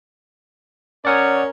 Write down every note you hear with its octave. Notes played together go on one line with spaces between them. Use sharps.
C#4 A#4 C#5 D5 F#5 D#6